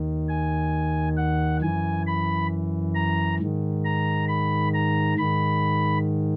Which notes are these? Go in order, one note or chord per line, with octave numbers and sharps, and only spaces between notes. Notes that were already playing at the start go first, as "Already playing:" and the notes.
Already playing: D#2 D#3
G#5
F#5
F#2 E3 G#5
B5
A#5
G#2 D#3
A#5
B5
A#5
G#2 D#3 B5